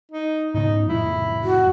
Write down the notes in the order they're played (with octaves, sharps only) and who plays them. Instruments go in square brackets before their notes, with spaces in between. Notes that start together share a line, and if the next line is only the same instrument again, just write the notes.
[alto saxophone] D#4
[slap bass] G#2 C#3 B3 [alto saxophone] D#4
[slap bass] F2 A2 C#3 [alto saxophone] E4
[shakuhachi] F#4